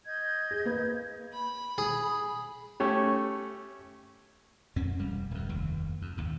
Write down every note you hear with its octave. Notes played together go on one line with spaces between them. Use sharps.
D#5 G6 G#6
G#4
A#3 B4
B5
G#4
A3 C#4 G4
F2 C4 C#4
E1 G3
D1 F2
F1 D#2
F2
G#1 D#2 G#2